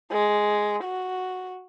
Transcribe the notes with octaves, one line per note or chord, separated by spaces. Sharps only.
G#3
F#4